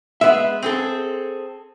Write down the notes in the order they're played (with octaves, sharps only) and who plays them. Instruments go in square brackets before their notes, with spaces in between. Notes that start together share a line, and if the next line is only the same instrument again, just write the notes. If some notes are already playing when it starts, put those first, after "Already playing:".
[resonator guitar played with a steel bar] G#3 B3 [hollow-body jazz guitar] E5
[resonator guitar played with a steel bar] C4 G#4 A4